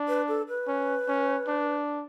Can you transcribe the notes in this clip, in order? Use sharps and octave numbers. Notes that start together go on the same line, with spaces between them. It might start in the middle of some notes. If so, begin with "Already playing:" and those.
Already playing: D4
B4
A4
B4
C#4
C#4
D4